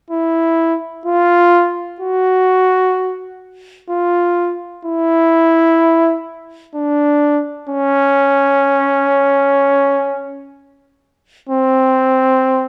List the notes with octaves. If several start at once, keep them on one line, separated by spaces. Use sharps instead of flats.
E4
F4
F#4
F4
E4
D4
C#4
C4